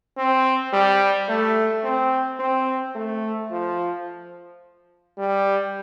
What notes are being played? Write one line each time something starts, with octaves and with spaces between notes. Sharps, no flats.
C4
G3
A3
C4
C4
A3
F3
G3